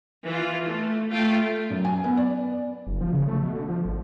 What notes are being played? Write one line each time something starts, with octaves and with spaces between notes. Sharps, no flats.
E3 F4
A3
A3 F4 G5
F#2
G#5
B3
D5
F#1
F3
C#3
A3
B2
D3
F3
G#1